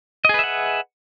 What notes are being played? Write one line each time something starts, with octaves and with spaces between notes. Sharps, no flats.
G#4 B4 D#5 E5 F#5